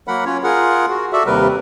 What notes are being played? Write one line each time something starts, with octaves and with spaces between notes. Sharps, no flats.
F#3 A#3 A#4 F#5 B5
C#4 F4 C#5
F4 G#4 A#4 F#5
F#4
F#4 A4 D5 E5
D#2 C3 G3 A#4 B4